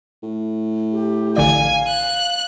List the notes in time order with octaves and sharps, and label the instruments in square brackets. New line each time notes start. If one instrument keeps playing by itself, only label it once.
[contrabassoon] A2
[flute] G4
[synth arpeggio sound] A1 D3 D5 [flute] F5 [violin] G#5
[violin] F#6